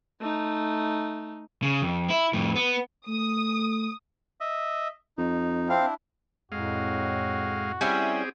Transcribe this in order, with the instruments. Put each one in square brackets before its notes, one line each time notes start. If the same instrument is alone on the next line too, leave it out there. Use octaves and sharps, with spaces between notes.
[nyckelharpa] A3 D#4
[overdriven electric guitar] C#3
F2
E4
F2 A2
B3
[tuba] A3 [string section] D#6
[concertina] D#5 E5
[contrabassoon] F2 [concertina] D#4
[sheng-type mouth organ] C4 F5 [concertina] D4 E4
[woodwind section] F2 A2 [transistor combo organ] G#3 F5 [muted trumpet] F#4
[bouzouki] G3 C#4 E4 [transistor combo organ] C4 G4 G#4